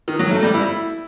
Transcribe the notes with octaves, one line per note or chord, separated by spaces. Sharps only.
D#3
F#3
A3
G3
E4